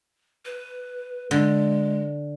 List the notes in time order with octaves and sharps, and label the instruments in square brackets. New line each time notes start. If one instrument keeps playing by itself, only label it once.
[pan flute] B4
[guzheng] D3 [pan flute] G#3